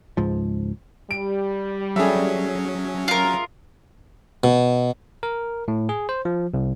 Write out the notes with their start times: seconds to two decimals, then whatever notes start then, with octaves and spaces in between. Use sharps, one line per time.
0.17 C#2 G#2 F3
1.11 G3 D7
1.96 F#3 C#4 G#4 A4 E5
3.08 F4 A#4
4.44 B2
5.23 A#4
5.68 A2
5.89 G#4
6.09 C5
6.25 F3
6.54 C2